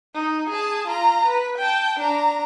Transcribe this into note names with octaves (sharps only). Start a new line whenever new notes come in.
D#4
G#4 A5
F4 A#5
B4
G5 A5
D4 A#5